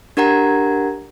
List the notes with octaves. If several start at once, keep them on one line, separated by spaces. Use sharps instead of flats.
D4 G4 A#4 F#5 A#5 G#6